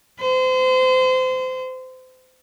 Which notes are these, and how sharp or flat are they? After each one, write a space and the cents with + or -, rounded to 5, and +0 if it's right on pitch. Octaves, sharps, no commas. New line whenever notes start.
C5 -30